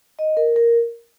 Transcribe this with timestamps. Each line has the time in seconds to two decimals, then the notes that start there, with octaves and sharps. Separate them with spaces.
0.19 D#5
0.37 A#4
0.56 A#4